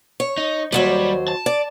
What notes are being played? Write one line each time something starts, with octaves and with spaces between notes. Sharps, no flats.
C#5
D#4
D#2 F#3 G3 C5
A5
D5